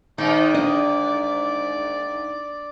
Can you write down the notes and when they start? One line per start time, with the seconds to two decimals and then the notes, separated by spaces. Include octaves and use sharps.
0.18 G#2 D#3 A#3 D#4 D5
0.55 D4 D#5